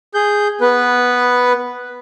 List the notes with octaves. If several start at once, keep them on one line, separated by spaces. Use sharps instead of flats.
G#4 G6
B3 B4